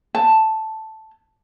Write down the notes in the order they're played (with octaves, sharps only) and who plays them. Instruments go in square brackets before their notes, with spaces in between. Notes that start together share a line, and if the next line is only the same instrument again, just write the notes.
[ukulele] A5